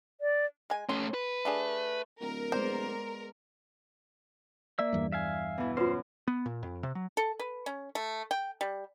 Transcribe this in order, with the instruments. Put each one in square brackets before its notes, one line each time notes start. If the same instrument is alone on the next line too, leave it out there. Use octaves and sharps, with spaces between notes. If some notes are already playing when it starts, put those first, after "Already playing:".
[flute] D5
[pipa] G#3 G#5
[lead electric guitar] A3 C#4 [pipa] C6
[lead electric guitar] B4
[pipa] A3 D4 G#4
[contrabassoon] D1 [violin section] A#4
[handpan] G#3 B3 D5 [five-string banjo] C5
[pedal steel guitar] A#3 E5 E6 [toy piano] D5
[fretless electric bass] E2 G2
[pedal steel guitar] E5 F5 G#5
[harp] B2 E3
[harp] F#2 [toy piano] F4 B4 [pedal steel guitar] C5
[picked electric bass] B3
A#2
F2
C3
F#3
[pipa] A4
B4
C#4
A3
G5
G3